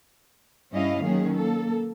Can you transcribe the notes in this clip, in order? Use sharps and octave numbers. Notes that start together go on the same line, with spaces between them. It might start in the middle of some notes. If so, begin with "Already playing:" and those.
G2 G3 C#4 E4 D#5 F5
D#3 F#3 A#3 C#4 G#4
A#3 A4